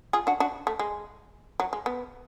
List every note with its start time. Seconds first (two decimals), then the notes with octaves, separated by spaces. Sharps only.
0.13 F4 G#4
0.27 D4 F#4
0.40 D4 F#4
0.67 A3
0.79 G#3
1.60 F#3
1.73 G#3
1.86 B3